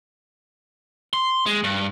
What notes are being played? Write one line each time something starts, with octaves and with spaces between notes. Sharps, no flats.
C6
G#3
G2